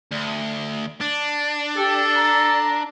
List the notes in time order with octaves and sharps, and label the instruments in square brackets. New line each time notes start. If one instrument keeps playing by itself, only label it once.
[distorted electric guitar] D2
D4
[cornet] G4 [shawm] A4
[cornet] A#5